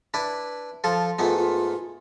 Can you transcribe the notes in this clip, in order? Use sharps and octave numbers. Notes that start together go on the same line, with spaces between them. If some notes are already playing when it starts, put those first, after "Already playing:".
D4 E4 B4
F3 F4 A4
G#2 A3 B3 F4
F4